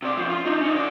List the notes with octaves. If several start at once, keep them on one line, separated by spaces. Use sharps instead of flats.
C3 D5
F3 C#4
F4
D4 D#4
C#4 D#4
C#3 D5